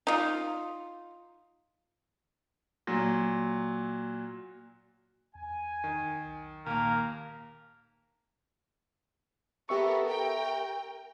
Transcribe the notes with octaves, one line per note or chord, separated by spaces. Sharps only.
D#4 F4
A#2 F#3
E2 G#5
D#3
B1
D#2 A#2 A#3 A#4 F5
B3 G4 A4 A#4 E5 C#6
A#4 G5